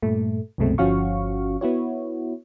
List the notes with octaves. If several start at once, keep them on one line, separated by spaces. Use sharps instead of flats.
G2 A#2 A3
C2 F#2 B2 G#3 A3 C4
G1 F3 C#4 F#4 F5 C#6
B3 E4 F#4 C#5